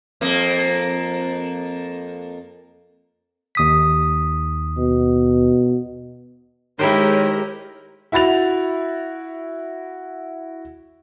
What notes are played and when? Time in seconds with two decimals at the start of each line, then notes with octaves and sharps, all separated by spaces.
0.21 F2 A#3
3.55 D#2 D#6 B6
4.78 B2
6.79 D#3 G#3 E4 G4 A#4 C5 C#5
8.12 E4 F#4 B5 A6 F7